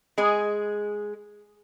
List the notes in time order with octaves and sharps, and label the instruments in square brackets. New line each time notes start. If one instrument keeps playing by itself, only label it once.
[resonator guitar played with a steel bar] G#3 G#4